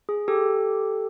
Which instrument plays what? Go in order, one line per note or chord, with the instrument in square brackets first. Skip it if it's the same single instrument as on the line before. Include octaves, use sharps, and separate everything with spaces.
[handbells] G#4
G4 A4